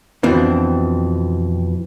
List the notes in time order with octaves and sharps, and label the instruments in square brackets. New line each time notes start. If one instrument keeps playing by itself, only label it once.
[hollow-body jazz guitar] F2 B2 E3 C4 D4